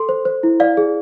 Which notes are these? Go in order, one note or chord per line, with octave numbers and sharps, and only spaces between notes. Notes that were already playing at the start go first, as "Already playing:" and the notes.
Already playing: A4 C6
C5
C5
E4
D5 F5
G#4